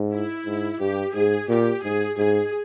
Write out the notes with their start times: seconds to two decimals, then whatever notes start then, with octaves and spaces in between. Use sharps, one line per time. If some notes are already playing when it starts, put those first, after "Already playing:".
Already playing: G#2
0.12 E4
0.46 G#2
0.80 G2 G4
1.15 G#2 G#4
1.49 A#2 G4
1.83 G#2 G#4
2.17 G#2 G#4